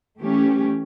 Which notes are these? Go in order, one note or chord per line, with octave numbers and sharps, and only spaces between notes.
E3 A3 C#4 G4